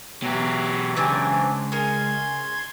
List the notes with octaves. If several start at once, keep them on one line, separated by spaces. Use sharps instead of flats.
B2 E3 F#3 G4
C#2 C4 D4 G#5
C#4 G#4 A#4 C6 G#6